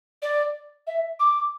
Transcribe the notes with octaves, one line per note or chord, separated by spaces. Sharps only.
D5
E5
D6